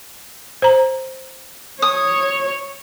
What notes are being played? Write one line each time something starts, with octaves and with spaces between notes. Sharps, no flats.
C5 A#5
C#5 D#6